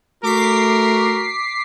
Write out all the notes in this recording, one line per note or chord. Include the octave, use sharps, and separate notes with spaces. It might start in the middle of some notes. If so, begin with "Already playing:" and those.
A3 F#4 A#4 D6 B6 C7